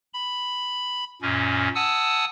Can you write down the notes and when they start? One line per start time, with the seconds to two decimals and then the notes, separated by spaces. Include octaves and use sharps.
0.13 B5
1.22 F#2 A#2 C#4
1.75 F#5 G#5 A5 D#6 E6